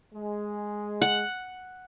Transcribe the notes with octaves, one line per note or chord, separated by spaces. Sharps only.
G#3
F#5